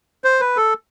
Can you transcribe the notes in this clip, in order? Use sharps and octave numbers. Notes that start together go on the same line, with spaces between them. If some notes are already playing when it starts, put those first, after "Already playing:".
C5
B4
A4